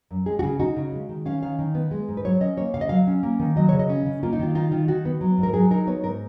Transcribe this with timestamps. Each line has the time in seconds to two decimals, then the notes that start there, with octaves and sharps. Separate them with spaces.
0.11 F#2
0.26 G#3 G#4
0.39 F#4
0.43 C#3 G#4
0.60 D#4 F#4
0.76 C#3
0.93 G#3
1.09 D#3
1.26 C#4 F5
1.42 D#3 F5
1.59 D#3
1.75 B3
1.91 G#3
2.09 G#2
2.17 B4
2.25 F#3 C#5
2.40 C#4 D#5
2.57 A#3 C#5
2.74 C#3 F5
2.81 D#5
2.89 F#3 F5
3.07 C#4
3.23 A#3
3.39 D#3
3.56 F#3 D#5
3.69 C#3 C#5
3.79 D#5
3.90 C#4
4.06 C#3
4.23 A#3 F4
4.33 D#4
4.39 D#3 F4
4.55 D#4 F4
4.72 D#3 F4
4.88 D#3 F#4
5.05 B3
5.21 F#3
5.38 G#2
5.43 A#4
5.54 F#3 G#4
5.71 D#4 A#4
5.87 B3 C#5
6.03 G#2 A#4